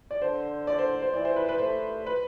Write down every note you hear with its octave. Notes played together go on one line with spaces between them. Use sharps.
D5
D3 C5
D5
C5
C5
E3 D5
C5
B4
B4
A3 C5
B4